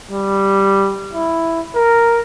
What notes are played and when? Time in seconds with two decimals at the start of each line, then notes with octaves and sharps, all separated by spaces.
0.12 G3
1.14 E4
1.75 A#4